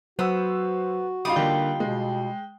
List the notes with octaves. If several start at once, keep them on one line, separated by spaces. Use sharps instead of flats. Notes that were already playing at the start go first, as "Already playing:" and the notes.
F#3 B3 F#4 C5 E6
G3 D#4 F4 D#6
D3 A#3 G5
B2 G#3